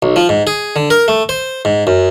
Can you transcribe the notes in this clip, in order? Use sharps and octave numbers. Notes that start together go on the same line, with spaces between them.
B1
F3
G#2
G#4
D3
A#4
A3
C5
G#2
F#2